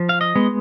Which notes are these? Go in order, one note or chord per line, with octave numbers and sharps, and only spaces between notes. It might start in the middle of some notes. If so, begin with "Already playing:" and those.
Already playing: F3
F5
D#5
G#3 B3